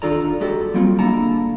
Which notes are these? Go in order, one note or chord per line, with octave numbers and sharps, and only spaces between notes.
D#3 D4 F4 A4 D5 A#5
G#3 F#4 G4 A4
F#3 G3 A#3 C4 F4
D3 G#3 A#3 E4 A5 A#5